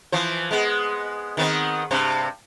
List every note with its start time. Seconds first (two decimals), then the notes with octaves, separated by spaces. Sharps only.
0.12 E3 F3 C5
0.51 G#3 B3
1.37 D#3 B3 C4
1.91 G2 C3 C5